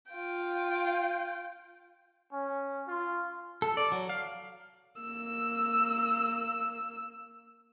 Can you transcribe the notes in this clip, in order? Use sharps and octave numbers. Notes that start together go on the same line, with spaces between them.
F4 G5
C#4
F4
A4
D5
F#3
F5
A#3 E6